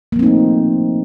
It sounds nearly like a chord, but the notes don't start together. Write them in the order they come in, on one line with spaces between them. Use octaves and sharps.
A#3 F3 C4 D#4 A3